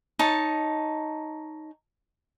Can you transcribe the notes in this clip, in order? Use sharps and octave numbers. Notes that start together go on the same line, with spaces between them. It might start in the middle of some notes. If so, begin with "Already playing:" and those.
D#4 C#5 A5